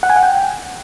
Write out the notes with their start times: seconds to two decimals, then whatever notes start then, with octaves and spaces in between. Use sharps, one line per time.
0.03 F#5
0.10 G#5
0.16 F#5
0.23 G5